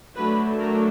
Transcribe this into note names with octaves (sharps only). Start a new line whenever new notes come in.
D3 F#3 A3 D4 B4
A#4